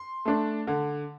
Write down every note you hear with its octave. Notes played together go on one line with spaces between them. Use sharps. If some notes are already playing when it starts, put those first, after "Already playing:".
Already playing: C6
A3 D4
D3